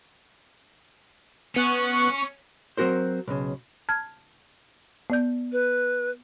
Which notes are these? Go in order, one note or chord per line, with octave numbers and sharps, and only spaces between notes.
B3 C#4 C#6 F#6
F#3 C4 F#4 A#4 C5
B1 C#3
A5 F6 G#6
B3 D5 G6
B4